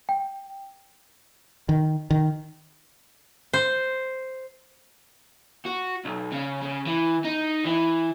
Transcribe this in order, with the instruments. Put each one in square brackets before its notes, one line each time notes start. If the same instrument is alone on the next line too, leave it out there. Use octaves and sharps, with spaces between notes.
[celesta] G5
[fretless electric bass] D#3
D#3
[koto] C5
[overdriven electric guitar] F#4
B1
C#3
C#3
E3
D#4
E3